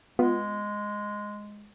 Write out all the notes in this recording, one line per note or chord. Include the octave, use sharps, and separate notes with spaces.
G#3 B3 F4